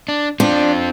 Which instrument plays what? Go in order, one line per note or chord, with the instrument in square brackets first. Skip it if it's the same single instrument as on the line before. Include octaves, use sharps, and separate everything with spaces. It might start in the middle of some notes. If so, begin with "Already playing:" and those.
[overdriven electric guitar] D4
[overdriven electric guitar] C4 F4 [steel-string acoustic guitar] D4